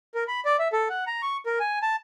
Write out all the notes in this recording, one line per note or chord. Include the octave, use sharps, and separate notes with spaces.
A#4
B5
D5
E5
A4
F#5
A#5
C#6
A#4
G#5
A5